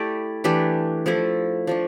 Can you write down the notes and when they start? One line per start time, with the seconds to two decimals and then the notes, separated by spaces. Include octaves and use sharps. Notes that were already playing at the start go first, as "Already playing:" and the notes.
Already playing: A3 E4 G4 D5
0.44 E3 A3 D4 G4
1.06 F3 A3 E4 A4
1.67 F3 A3 D4